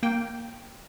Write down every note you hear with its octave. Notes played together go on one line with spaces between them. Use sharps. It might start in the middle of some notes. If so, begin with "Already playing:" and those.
A#3 G5